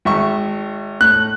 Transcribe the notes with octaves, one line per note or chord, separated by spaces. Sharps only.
G#1 E5 C#6
A2 F#6